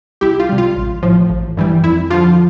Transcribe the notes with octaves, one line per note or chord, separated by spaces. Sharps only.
C2 E4 G4
F4
C3 G3
F4
A1
A2 F3
A1
G2 E3 G3
F2 E4
D3 F3 F4